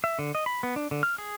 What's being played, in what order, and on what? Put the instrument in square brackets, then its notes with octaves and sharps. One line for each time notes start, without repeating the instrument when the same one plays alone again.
[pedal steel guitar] E5
D3
D#5
B5
B3
D4
D3
F6
G#4